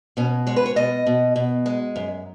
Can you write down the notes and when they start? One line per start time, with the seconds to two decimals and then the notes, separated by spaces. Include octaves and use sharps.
0.17 B2 C#4
0.47 G#3 C#5
0.56 B4
0.66 C#5
0.76 B2 D#5
1.06 B2
1.36 B2
1.66 G#3
1.96 F#2